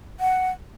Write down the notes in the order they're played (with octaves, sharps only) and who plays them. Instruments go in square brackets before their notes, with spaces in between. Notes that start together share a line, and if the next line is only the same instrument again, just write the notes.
[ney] F#5